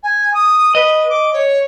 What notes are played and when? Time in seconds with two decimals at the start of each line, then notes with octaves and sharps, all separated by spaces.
0.03 G#5
0.34 D#6
0.75 B4 D#5
1.09 D6
1.33 C#5